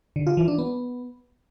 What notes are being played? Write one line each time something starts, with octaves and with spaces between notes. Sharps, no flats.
D3
F4
E3
D4
B3